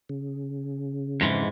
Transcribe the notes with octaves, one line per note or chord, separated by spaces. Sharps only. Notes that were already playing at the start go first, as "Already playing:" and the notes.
C#3
F2 G#2 E3